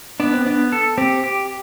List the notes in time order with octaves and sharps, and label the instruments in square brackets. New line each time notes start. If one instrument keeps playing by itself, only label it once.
[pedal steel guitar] B3 [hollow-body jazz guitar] D4
[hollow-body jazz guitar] C4
[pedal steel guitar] B3 [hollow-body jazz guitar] D4
[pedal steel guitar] A4
[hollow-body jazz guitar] C4 [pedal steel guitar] G4
[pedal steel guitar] G4